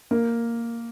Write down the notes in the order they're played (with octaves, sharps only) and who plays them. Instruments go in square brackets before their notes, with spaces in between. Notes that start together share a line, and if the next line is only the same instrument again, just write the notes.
[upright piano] A#3